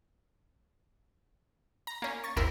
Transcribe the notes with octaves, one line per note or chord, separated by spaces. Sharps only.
A#5
A#3 C#4
C#6 A6
G#1 D#2 C4 E4 A#4 C6